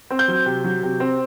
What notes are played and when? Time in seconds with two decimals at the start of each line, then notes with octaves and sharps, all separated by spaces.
0.10 C4
0.19 G6
0.28 F#3
0.46 C3
0.64 F#3
0.83 C3
1.00 C4